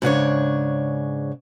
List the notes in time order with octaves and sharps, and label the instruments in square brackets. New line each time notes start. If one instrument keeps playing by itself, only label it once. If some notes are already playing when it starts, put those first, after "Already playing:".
[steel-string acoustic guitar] G#2 C#3 D4 C#5